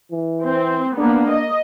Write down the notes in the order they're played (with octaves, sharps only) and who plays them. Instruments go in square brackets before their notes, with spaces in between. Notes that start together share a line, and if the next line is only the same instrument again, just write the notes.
[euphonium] E3
[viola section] C4
[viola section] A#3 B3 [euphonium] D4
[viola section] D#5